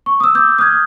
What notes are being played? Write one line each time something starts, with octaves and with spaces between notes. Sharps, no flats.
C#6
D#6 E6
D6 E6 G6
D#6 F6 G6 G#6